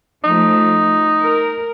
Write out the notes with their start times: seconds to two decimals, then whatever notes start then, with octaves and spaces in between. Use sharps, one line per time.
0.24 F3 A3 D#4
1.21 A#4